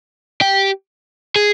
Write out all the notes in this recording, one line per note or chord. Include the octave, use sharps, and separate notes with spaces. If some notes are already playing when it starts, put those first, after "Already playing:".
G4
G#4